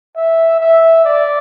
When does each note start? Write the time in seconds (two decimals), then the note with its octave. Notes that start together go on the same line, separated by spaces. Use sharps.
0.16 E5
0.61 E5
1.05 D5